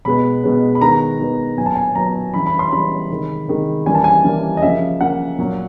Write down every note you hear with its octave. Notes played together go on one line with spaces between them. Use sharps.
B2 G#3 B3 B5
B2 G#3 B3
B5
D#3 G#3 B3 A#5
D#3 G#3 B3
A#2 F#3 B3 G#5
A5
G#5
A#2 F#3 B3 A#5
C#3 E3 G3 B5
B5
C6
C#3 E3 G3 B5
C3 D#3 G#3
C3 D#3 G#3
C#3 E3 G3 A#3 G#5
A5
G#5
C#3 E3 G3 A#3
D#5
C#3 F3 A#3 E5
C#3 F3 A#3 F#5
A#2 F#3 A#3